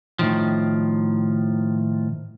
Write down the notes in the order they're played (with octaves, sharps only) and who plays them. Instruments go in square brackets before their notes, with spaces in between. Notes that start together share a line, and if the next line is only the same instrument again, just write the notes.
[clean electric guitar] A2 D#3 F3